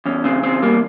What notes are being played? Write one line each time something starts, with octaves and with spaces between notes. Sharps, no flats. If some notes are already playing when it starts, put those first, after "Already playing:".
E2 C#4
C#3 C4
E2 C4
G3 A#3